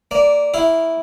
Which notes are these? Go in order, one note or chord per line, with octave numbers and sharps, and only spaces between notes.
A#3 D5
E4 F5